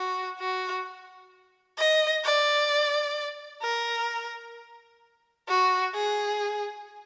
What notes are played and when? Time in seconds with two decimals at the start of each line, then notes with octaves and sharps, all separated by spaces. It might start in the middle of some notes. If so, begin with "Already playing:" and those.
Already playing: F#4
0.40 F#4
1.78 D#5
2.25 D5
3.63 A#4
5.48 F#4
5.94 G#4